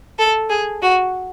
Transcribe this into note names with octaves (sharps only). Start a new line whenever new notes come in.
A4
G#4
F#4